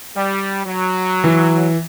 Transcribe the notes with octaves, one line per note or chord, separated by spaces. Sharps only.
G3
F#3
E3